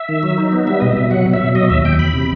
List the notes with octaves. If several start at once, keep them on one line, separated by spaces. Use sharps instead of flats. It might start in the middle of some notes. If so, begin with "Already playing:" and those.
Already playing: E5
D#3
F#3
D#4
B3
G3 E5
B2 D#5
B2 E5
F#3 F#5
B2
E5
B2
F#3 D#5
D#2 E5
D#2 G5
E2 B5
C3